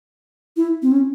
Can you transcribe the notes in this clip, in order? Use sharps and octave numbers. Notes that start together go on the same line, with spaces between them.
E4
C4
C#4